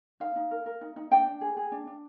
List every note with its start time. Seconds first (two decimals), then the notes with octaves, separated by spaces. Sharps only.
0.20 D#4 F5
0.36 D#4
0.51 A#4
0.66 A#4
0.81 D#4
0.96 D#4
1.11 D4 G5
1.26 D4
1.41 G#4
1.57 G#4
1.72 D4
1.87 D4